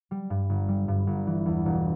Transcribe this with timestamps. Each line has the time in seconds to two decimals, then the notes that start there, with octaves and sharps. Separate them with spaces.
0.11 G3
0.30 G2
0.49 G1
0.68 G3
0.88 G2
1.07 G1
1.27 E3
1.46 E2
1.66 E1